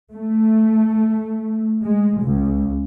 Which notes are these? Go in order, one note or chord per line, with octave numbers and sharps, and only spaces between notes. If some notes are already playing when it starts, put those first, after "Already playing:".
A3
G#3
C#2